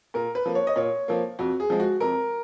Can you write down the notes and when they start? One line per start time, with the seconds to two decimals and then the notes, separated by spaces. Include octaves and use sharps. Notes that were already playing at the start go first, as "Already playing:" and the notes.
0.14 A#2 A#4
0.35 B4
0.46 F3 A#3
0.55 C#5
0.67 D#5
0.76 A#2 C#5
1.08 F3 A#3
1.39 F2 F#4
1.60 G#4
1.70 F3 G#3
1.80 F#4
2.00 F2 A#4